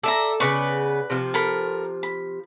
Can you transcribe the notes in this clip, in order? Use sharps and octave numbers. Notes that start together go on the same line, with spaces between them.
A4 D5 E5 A#5
C#3 B3 B4 D5 C#6
C3 F3
A4 A#4 B5
B5